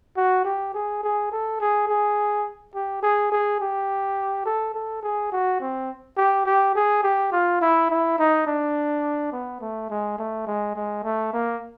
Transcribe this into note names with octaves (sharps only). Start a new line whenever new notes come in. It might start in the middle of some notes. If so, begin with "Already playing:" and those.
F#4
G4
G#4
G#4
A4
G#4
G#4
G4
G#4
G#4
G4
A4
A4
G#4
F#4
C4
G4
G4
G#4
G4
F4
E4
E4
D#4
D4
B3
A3
G#3
A3
G#3
G#3
A3
A#3